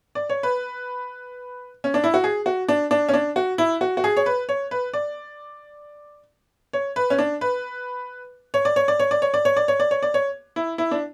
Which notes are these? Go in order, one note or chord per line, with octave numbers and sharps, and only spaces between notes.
D5
C#5
B4
C#4
D4
E4
F#4
G#4
F#4
D4
D4
C#4
D4
F#4
E4
F#4
F#4
G#4
C#5
B4
C#5
B4
D5
C#5
B4
C#4
D4
B4
C#5
D5
C#5
D5
C#5
D5
C#5
D5
C#5
D5
C#5
D5
C#5
D5
C#5
E4
E4
D4